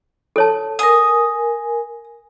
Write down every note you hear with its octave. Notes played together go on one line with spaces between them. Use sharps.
A4 C#5 A5
A#4 G#5 D#6